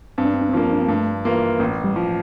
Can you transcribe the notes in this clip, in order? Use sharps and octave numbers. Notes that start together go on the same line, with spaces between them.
G2 C4
D4
C4
D4
C4
F3 A#3 D4
C4
D4
C4
G2 A3
E3 A#3 F4
A1 A#3
G3
F3